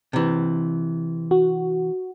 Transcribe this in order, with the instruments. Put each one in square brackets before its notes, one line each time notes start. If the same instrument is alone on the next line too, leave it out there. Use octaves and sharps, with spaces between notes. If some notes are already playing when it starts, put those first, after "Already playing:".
[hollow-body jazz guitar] C3 E3
[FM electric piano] F#4